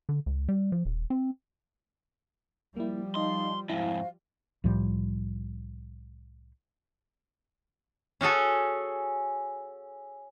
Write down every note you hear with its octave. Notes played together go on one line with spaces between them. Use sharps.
D3
C#2
G3
F3
D#1
C4
F3 G3 A#3 E4
D#4 D#5 F5 A5 C6
F2 G#2 E4 F#4 C5 F5
C2 A2 F3 G3
C#4 F#4 G#4 A4